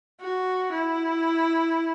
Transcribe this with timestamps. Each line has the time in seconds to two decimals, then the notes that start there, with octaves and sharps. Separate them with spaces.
0.21 F#4
0.73 E4